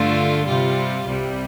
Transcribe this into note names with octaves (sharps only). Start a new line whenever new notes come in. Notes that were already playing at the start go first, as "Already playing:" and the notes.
Already playing: G2 D3 A3 F4
C3 G3 F4
C2 C3 G3